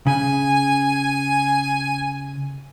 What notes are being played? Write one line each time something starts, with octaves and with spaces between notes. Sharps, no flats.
C#3 G#5